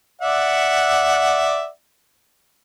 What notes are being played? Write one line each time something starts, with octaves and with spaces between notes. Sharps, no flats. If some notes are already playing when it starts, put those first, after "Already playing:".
D5 E5 F#5